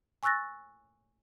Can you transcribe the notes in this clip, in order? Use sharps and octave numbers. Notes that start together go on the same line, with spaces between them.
G#5 C#6 E6 F#6 A6 A#6